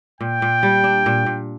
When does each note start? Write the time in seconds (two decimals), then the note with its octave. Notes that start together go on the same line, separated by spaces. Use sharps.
0.21 A#2 G5
0.42 A#2
0.63 G3
0.84 D4
1.06 A#2
1.26 A#2